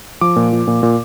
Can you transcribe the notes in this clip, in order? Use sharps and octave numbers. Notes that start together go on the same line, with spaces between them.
F3 D6
A#2
F3
A#2
A#2